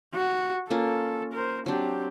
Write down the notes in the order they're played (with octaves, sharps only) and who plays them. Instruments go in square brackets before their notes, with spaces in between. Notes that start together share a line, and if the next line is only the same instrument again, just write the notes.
[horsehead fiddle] F#4
[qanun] A#3 C#4 F4 [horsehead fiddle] A4
[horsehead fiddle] A#4 C5
[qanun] F#3 D4 [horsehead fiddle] C4 G4